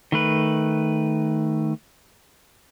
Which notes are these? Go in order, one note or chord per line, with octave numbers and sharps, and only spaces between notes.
D#3 A3 B4